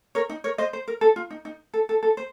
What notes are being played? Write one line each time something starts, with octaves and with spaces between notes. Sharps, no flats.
A#4 C#5
D#4
A#4 C#5
C5 D#5
C5
A#4
A4
F4
D#4
D#4
A4
A4
A4
C5